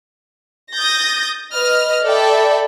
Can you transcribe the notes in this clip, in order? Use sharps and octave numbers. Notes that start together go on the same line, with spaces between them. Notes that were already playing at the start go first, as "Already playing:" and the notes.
D#6 G6 A6 A#6
B4 D#5 F6
A4 D5 E5 G5 B5